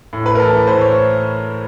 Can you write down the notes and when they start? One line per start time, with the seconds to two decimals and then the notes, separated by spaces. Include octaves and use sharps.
0.13 A2
0.26 B4
0.35 A#4
0.40 E3 A4
0.67 A2 C5
0.81 C#5